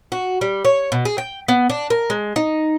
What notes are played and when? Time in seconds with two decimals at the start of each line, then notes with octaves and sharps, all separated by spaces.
0.12 F#4
0.41 G3
0.65 C#5
0.92 B2
1.05 G#4
1.18 G5
1.48 B3
1.70 D4
1.90 A#4
2.10 G#3
2.36 D#4